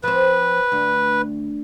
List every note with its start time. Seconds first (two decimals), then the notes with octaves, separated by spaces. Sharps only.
0.03 F3 C4 B4
0.72 D2